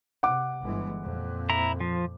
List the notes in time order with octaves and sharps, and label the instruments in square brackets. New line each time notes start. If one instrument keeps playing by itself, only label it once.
[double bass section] C3 [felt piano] F#5 D6
[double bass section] G1 E3 G#3
F2 A#2
[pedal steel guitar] E4 A#5
F3